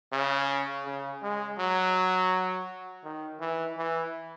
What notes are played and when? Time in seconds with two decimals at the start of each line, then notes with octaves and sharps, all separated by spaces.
0.12 C#3
0.86 C#3
1.23 G#3
1.58 F#3
3.04 D#3
3.40 E3
3.77 E3